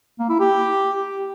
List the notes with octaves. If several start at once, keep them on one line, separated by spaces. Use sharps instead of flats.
A#3
E4
G4